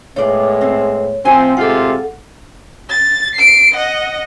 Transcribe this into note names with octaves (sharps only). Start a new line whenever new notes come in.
A2 G#3 B3 F4 C#5 D5
C4
A2 F3 C4 G#5
C3 G#3 F4 A4 F#5
A6
C7 D7
D#5 F#5